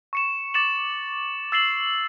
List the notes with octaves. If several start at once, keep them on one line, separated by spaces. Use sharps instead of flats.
C#6 C#7 E7
D6 A6 C#7 E7 F#7
E6 A6 C7 E7 F#7 G7